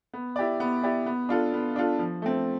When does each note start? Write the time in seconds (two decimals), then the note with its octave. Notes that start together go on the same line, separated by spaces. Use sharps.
0.14 B3
0.36 E4 G4 D5
0.60 B3
0.83 E4 G4 D5
1.06 B3
1.29 D4 F4 A4
1.53 B3
1.76 D4 F4 A4
1.99 F3
2.22 A3 C4